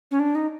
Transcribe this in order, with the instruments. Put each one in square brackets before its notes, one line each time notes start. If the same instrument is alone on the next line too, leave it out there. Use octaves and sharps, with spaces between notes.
[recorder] C#4
D4
D#4